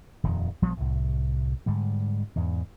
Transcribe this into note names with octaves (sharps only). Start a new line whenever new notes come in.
D#1 F2 D#3
A#1 F3 G3 B3
C2 A2
G#2 D3 G3
E2 G#2